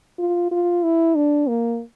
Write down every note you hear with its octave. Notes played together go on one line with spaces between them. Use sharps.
F4
F4
E4
D4
A#3